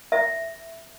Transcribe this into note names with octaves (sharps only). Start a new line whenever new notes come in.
E5